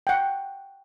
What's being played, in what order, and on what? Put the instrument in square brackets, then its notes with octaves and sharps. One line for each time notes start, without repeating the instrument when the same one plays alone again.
[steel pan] F#5 G5